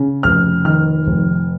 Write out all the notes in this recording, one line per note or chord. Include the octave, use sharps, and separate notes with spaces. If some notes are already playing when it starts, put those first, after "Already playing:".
Already playing: C#3
F1 F6
D#3 F6
F1